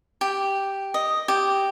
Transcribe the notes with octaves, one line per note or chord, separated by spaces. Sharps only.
G4
D#5
G4